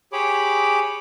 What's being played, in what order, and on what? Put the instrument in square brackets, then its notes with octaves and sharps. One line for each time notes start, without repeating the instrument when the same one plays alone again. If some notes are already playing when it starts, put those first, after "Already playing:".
[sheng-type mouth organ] G4 G#4 C#5 B5 D6